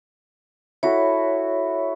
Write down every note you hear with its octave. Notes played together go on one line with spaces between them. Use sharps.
E4 F#4 A4 C#5